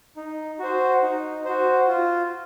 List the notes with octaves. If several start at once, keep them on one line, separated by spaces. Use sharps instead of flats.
D#4
F#4 C5
D#4
F#4 C5
F4